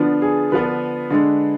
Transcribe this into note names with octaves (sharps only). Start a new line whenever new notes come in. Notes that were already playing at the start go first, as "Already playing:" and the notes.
Already playing: D3 F3 B3 D4
G#4
D3 F3 B3 D4 B4
D3 G#3 D4